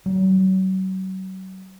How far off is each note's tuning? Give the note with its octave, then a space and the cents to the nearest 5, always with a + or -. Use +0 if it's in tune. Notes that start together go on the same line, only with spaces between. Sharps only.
F#3 +35